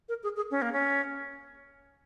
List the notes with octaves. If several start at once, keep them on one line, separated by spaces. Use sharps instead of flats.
A#4
G#4
G#4
C#4
A#3
C#4